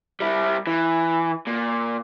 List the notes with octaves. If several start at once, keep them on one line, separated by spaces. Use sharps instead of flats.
G3 E4
E3
A#2